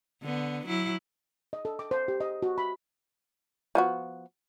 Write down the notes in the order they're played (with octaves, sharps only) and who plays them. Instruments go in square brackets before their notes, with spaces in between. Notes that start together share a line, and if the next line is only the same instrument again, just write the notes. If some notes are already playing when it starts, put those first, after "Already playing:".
[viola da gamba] D3 B3
F#3 E4
[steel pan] D#5
A4
D6
C5
G4
D#5
F#4
B5
[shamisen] F3 B3 F#4